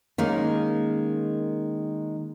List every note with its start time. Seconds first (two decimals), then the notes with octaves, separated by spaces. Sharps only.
0.18 D#3 G#3 A#3 C#4